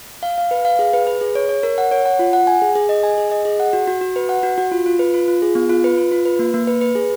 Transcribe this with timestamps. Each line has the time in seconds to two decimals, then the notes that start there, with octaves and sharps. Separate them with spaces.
0.23 F5
0.38 F5
0.51 B4
0.65 F5
0.79 G#4
0.93 B4
1.07 B4
1.21 G#4
1.35 C#5
1.49 C#5
1.63 A#4
1.78 F#5
1.91 C#5
2.06 F#5
2.19 F4
2.33 F#5
2.47 G#5
2.62 G#4
2.76 G#4
2.89 D#5
3.03 G#5
3.18 G#4
3.31 D#5
3.45 G#4
3.60 F#5
3.73 F#4
3.88 F#4
4.01 F#4
4.16 B4
4.29 F#5
4.43 F#4
4.58 F#4
4.72 F4
4.86 F4
4.99 B4
5.14 F4
5.28 F4
5.42 G#4
5.55 B3
5.69 F4
5.84 B4
5.98 F4
6.11 F4
6.25 B4
6.39 A#3
6.54 A#3
6.67 B4
6.81 B4
6.95 G#4